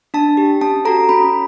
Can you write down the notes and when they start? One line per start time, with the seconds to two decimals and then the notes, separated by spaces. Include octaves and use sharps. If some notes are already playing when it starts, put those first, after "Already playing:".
0.14 D4 A5
0.37 G4
0.61 C#4 A5
0.85 F#4 A4 A#5
1.09 C#4 B5